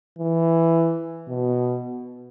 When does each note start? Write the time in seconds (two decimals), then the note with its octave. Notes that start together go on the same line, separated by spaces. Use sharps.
0.18 E3
1.28 B2